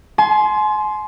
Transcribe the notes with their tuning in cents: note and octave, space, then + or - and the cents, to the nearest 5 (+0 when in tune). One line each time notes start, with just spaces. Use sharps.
G#5 +40 C6 +0